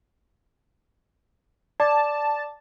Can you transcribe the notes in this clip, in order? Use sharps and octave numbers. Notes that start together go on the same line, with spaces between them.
D5 A5 D6